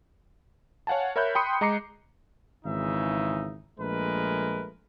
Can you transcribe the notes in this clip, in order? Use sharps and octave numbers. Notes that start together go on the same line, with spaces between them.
C#5 F5 F#5 G#5 A5
A#4 C#5 E5 B5 F#6 G6
G5 B5 C6 D#6 C#7
G#3 D#5 A#5 D6 C7 C#7
G#1 C#3 E3 D#4 E5
A#1 G#3 A3 A#4 B4